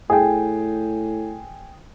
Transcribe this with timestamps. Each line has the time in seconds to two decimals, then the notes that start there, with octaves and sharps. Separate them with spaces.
0.10 A2 G#4 G5